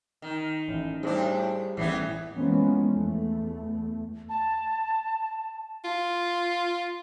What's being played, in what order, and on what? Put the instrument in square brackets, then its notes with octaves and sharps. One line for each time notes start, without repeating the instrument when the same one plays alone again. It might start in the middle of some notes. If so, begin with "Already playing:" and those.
[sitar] D#3
[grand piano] A1
[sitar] A2 D4 [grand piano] G3 G#4 C5
[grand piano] A1 A2 C7 [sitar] E3 G3 B3
[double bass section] E3 F3 G#3 A#3 B3 C#4
E2 A3
[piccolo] A5
[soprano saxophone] F4